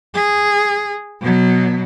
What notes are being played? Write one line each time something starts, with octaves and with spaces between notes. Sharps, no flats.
G#4
B2 F#3